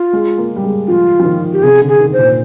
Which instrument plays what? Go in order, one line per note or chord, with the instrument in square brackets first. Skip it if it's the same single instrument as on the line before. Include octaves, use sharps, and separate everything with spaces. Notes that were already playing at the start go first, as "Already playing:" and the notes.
Already playing: [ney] F4
[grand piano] G#3
A#3
G3
G#3
[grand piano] F3 [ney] F4
[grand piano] F3
D#3
[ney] G4
[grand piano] C3 [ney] G#4
[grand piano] D3
[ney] G#4
[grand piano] D#3
[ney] C5
[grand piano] A#2